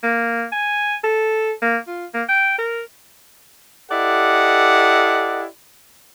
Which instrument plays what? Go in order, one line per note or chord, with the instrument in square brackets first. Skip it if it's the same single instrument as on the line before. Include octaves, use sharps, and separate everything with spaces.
[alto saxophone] A#3
G#5
A4
A#3
F4
A#3
G5
A#4
[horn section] E4 G4 A4 D5 D#5 F#5